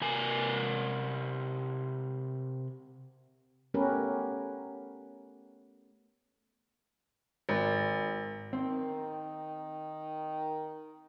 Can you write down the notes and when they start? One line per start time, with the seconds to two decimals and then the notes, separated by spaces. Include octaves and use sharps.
0.01 C3 A#4 G#5
3.74 A3 B3 C#4 G4 A#4 B4
7.49 G#1
8.53 D#3 C4